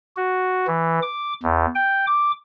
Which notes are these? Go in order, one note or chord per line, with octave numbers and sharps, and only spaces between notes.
F#4
E3
D6
E2
G5
D6